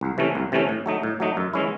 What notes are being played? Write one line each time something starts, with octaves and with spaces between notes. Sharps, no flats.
C2
C3 E3 A3 C#4
C2
C3 E3 A3 C#4
A2
F#3 A3 D#4
A2
F#3 A3 D#4
F#2
E3 G#3 C#4 E4